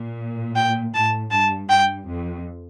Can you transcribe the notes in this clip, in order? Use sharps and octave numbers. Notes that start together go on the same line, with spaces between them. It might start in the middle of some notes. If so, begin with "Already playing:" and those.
Already playing: A#2
G5
A2 A5
G2 A5
G2 G5
F2